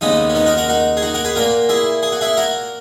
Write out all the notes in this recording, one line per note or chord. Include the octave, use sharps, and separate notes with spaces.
D#2 C#3 G#3 B3 D#4
C#4
B3 D#4
F#4 A#4
F#4 A#4
D#4 F#4
G#4
D#4 F#4
F#4 A#4
G#4 B4
A#2 A#3 F#4 A#4
E4 G#4
G#4
F#4
E4 G#4
F#4 A#4